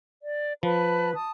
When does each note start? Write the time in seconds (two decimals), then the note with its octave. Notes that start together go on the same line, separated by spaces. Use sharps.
0.23 D5
0.63 F3 B4 A5 B5
1.14 A5 D#6